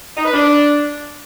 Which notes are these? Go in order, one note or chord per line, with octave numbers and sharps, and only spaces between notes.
D#4
B4
D4